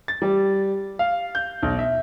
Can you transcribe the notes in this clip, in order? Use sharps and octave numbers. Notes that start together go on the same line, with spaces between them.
A6
G3
F5
G6
B1
E5